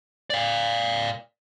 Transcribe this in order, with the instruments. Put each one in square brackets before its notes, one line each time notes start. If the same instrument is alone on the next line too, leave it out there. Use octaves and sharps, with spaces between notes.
[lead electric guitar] D5 F5